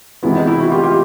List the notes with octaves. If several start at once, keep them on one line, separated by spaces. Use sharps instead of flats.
C3 E3 G#3 B3 E4
D#4
E4
E4 F#4
F4 G4
F4 G4